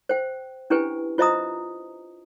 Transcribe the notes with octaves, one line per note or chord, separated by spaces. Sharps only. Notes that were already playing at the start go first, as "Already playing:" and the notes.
C5 G5
C#4 D4 E4 G4 B4 G#5
F4 C5 D#5 E5 A#5 D#6